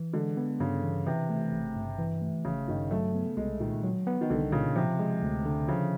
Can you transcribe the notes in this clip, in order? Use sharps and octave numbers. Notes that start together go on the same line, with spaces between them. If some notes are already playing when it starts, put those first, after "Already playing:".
Already playing: E3
D3 G#3
B3
G2 C#3
E3
C3 E3
A3
G#1
G2
E3
A3
G#1 C#3
G2 D#3
F#3 A3
B3
C2 G#3
A#2 D#3
F#3
B3
D#3
C2 D3
A#2 C#3
C3 F3
G#3
D2
D3
C#3 F3